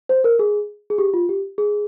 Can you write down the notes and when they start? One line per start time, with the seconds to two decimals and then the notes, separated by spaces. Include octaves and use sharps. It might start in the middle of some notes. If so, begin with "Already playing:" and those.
0.09 C5
0.24 A#4
0.39 G#4
0.90 G#4
0.98 G4
1.14 F4
1.29 G4
1.58 G#4